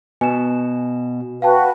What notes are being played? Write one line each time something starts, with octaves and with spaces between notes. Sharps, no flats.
B2 G#5 E7
F#4 B4 F5 G5 A5